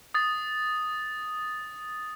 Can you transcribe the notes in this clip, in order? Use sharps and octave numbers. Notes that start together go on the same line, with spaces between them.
D#6 A6